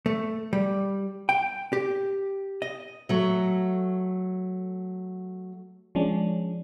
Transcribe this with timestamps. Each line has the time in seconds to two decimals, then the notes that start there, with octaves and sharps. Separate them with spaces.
0.06 A3
0.53 G3
1.29 G5
1.73 G4
2.62 D#5
3.09 F#3 A3
5.95 F3 G#3 C#4 D4